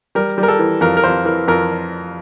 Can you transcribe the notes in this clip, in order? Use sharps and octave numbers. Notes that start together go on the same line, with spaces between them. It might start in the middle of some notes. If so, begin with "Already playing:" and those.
G3 A#4
G3
A#4
A4
E3
F2 A#4
A#4
F2 C5
E3 A#4
F2 A#4